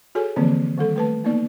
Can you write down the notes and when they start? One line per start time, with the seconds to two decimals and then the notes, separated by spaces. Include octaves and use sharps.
0.15 F#4 G#4 A4 C#5 G#5
0.36 D3 E3 F3 A#3 C4
0.78 D#3 G3 A4
0.96 A3 B4 A5
1.24 A#3 B3 D#4 D5